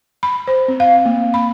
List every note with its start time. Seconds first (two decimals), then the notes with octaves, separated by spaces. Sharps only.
0.23 B5
0.47 C5
0.68 C4
0.80 F5
1.05 A#3
1.34 B5